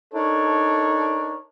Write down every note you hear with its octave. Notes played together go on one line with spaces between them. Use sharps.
D4 D#4 A4 A#4 C#5